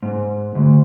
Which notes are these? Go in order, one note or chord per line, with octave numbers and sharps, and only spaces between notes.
G#2
D2